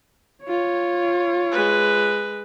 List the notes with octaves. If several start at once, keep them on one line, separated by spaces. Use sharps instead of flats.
F4 C#5
G#3 B4